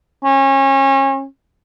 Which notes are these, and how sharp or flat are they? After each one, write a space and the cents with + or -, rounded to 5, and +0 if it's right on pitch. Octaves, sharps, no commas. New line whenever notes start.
C#4 -30